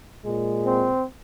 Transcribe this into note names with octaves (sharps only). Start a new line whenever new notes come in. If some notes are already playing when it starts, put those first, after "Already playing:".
A#2 G#3
C4